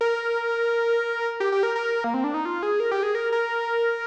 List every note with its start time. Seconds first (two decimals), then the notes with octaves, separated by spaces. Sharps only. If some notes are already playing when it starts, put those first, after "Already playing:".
0.01 A#4
1.40 G4
1.52 G4
1.63 A#4
1.76 A#4
2.04 A#3
2.14 C4
2.24 D4
2.34 D#4
2.45 F4
2.63 G#4
2.80 A#4
2.91 G4
3.03 G#4
3.15 A#4
3.32 A#4